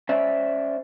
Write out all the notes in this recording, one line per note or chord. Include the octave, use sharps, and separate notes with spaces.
C#4 C5 D5 E5